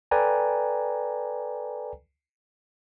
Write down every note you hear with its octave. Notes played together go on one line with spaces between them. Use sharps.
A4 B4 D5 G5 G#5 A#5